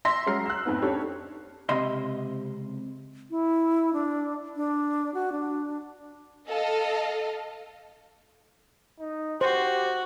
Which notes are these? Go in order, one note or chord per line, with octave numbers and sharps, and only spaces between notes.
E5 C6 A#6
F#3 G#3 C#4 A#5 F6 C7
E6 F#6
F2 G#2 B3
C#4 D4 G4 A4 C#5
C#2 C3 D#5 B5 C6
E4
D4
D4
F#4
D4
A4 D#5 F5
D#4
F#4 G4 C5